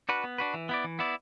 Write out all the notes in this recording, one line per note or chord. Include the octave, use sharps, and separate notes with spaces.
D4 F#4 B4
B3
D4 F#4 B4
E3
B3 E4 D5
E3
B3 E4 D5